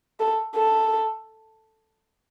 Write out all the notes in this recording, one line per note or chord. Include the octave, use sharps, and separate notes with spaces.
A4
A4